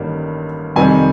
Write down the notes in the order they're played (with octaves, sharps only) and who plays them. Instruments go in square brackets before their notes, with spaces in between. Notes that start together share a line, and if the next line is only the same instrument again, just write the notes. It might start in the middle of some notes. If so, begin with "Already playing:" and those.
Already playing: [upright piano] A1 G2 D#3 G3 A#3
F2 C3 D#3 G3 G#5